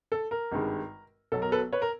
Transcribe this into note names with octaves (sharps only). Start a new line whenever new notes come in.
A4
A#4
G#1 G2 D#3 G#3
B1 B2 F#3 A4
A#4
A4 B4
B4 C#5
A#4